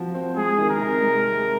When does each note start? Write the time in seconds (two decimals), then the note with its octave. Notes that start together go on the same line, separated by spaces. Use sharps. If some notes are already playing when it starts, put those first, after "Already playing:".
Already playing: F3 C4 F#4
0.15 C4
0.36 G#3 G#4
0.58 D#3
0.70 A#4
0.80 C3
1.02 G#3
1.24 G#3